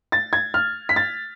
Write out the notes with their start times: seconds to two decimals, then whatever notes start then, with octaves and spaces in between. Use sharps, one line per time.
0.12 A6
0.33 G#6
0.54 F6
0.89 B6
0.96 A6